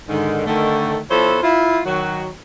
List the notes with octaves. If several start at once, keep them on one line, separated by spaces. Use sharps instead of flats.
G#2 D3 D#3
D3 D#3 A3
F3 B3 E4 A4 C5 C#5
E4 F4
D#3 F#3 F#4